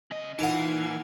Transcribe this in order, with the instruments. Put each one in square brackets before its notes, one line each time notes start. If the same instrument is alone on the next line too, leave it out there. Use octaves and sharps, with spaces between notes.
[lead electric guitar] C#3 D#5
[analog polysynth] A#2 F5 G#6 [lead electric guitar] E3 [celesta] D#4 [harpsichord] F#5 A5